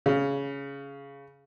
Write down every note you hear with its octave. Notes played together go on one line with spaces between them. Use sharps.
C#3